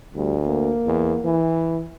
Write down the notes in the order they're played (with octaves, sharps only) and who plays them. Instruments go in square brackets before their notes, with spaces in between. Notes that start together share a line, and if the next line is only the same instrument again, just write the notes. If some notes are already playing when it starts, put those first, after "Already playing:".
[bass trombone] D2 [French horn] G3
[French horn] A#3
[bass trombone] E2
E3